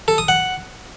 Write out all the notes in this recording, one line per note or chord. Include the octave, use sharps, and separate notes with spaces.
A4
D#6
F#5